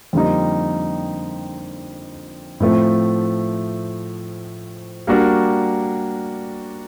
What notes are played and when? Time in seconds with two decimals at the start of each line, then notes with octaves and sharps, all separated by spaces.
0.13 F2 D3 G3 A#3 D#4
2.60 A2 F3 A3 C4
5.07 G3 A#3 D4 F#4 A#4